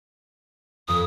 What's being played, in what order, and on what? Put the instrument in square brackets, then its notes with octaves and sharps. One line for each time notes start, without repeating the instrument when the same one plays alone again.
[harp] F2 C4 [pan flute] D#6